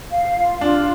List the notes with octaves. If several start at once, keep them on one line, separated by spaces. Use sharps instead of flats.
F5
F4
D4 F4